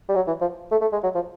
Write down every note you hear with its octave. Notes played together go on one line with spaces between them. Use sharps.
G3
F#3
E3
F3
A3
A3
G#3
F#3
F3